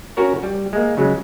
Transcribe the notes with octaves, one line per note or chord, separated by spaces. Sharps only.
C#4 F#4 A#4 C#5
G3
G#3 A#3
C#3 F#3 G#3